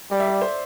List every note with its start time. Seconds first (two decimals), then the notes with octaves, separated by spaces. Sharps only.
0.11 G3 D5
0.20 E5
0.27 D5
0.41 C5